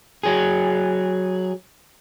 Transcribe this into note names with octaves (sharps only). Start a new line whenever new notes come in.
F#3 G#4